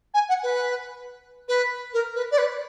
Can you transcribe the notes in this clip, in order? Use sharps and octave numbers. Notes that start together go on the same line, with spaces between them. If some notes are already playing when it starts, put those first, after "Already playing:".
G#5
F#5
B4
B4
A#4
B4
D5
B4